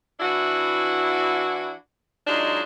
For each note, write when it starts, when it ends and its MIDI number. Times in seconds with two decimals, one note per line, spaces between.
0.20 1.73 52
0.20 1.73 62
0.20 1.73 64
0.20 1.73 66
2.27 2.61 54
2.27 2.61 56
2.27 2.61 62
2.27 2.61 63
2.27 2.61 65